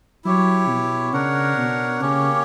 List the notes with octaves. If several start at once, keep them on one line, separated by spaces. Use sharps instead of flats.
F#3 E4 G4 C#5
B2
C#3 D4 A#4 C#5 F#5
B2
C#3 A#3 C#4 G4 C#5